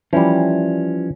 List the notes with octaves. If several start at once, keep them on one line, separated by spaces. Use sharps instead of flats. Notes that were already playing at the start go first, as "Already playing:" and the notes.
E3 F3 G3 C#4